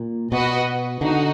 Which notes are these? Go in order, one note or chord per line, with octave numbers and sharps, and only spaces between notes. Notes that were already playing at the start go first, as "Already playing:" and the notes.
Already playing: A#2
B2 F#4 B4 D#5
D3 D#4 F#4